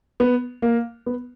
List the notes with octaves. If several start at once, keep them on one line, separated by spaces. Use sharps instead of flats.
B3
A#3
B3